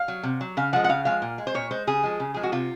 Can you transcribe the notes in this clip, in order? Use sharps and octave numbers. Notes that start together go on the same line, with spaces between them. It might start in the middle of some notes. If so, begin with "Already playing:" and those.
Already playing: F5
F#3
C3
F#3
C#3 F5
F3 G#3 F#5
F#5
C#3 F5
F3 G#3 F5
A#2
G#3
C5
A#2 C#5
G#3 C5
C#3 G#4
F3 G#3
C#3
F3 G#3 G#4
F#4
C3 F4